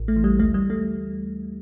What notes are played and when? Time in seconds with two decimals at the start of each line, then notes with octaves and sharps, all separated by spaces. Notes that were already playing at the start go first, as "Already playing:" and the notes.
Already playing: A1
0.08 A3
0.16 E3
0.24 G3
0.39 D2 A3
0.54 G3
0.70 A3